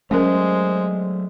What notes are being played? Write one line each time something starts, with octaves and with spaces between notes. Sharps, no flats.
F#3 G#3 A3 C#4 A#4 C5